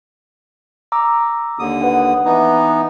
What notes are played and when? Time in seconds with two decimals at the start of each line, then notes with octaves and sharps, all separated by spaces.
0.92 A#5 D6 E6
1.59 D#2 D3 D#6
1.82 B4 F#5
2.25 E3 B3 D#4